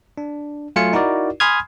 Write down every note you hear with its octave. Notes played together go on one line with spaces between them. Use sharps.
D4
F#3 A3 F4 F5 G#5 C#7
D#4 E4 F#4 A#4 D5
G#5 B5 C6 D#6 F6 G#6